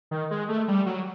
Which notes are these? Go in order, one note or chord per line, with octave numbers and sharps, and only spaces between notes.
D#3
G#3
A3
G3
F#3